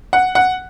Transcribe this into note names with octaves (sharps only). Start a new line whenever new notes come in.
F#5
F#5